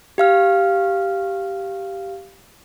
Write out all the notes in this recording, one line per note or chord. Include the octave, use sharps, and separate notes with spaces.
G4 F5 F6